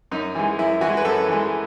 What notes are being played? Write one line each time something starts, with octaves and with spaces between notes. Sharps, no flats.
F#2 D#4
E3 G#3
F#2 E4
E3 F#4
G#3
B4
F#2 A4
E3 G#3